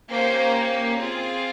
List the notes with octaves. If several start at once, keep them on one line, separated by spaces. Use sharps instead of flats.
A#3 C#4 G4 C5
C4 F4 G#4